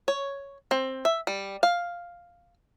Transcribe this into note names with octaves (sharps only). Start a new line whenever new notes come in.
C#5
C4
E5
G3
F5